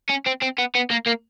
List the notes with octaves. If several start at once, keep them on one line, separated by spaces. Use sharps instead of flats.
C#4
C4
C4
B3
B3
A#3
A#3